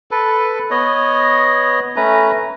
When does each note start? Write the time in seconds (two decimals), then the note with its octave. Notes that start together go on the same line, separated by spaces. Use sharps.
0.11 A4 B4
0.71 B3 C#5 D#5
1.96 A3 C#4 B4 A#5